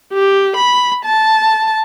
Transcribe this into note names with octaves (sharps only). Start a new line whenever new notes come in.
G4
B5
A5